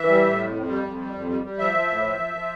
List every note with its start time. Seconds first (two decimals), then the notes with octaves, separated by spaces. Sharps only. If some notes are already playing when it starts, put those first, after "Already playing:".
Already playing: E3 E5
0.08 G3
0.23 A2
0.38 F2
0.53 F2
0.68 G3
0.83 F2
0.98 G3
1.13 F2
1.28 G3
1.43 G3
1.59 F3 E5
1.74 F3
1.89 A2
2.03 F3
2.19 F3
2.34 F3